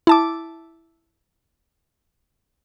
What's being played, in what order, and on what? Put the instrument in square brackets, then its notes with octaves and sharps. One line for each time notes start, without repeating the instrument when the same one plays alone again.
[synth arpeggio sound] E4 A5 D6